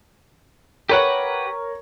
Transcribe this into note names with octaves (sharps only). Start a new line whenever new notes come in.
G4 A#4 B4 C#5 F#5